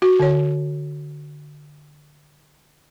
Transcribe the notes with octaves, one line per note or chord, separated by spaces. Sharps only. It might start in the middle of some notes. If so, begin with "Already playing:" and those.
F#4
D3 C#5